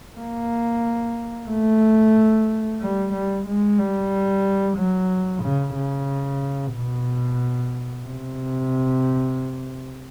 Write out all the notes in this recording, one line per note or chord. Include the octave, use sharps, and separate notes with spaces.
A#3
A3
G3
G3
G#3
G3
F#3
C#3
C#3
B2
C3